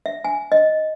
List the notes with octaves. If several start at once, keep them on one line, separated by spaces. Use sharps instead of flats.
E5
G#5
D#5